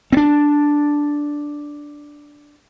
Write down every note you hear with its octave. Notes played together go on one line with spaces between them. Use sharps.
C4 D4